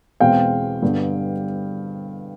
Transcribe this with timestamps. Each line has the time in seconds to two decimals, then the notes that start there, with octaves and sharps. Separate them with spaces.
0.20 E2 B2 G#3 C4 F5 G5
0.82 G2 D3 G3 B3